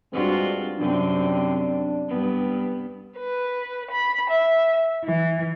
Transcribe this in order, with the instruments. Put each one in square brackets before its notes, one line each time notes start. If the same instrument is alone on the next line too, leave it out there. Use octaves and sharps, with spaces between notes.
[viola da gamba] G2 F4 F#4 [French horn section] G#3 C4 D4
[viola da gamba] F#2 C3 C4 [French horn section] D4
[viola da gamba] G2 B3
[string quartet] B4
B5
E5
E3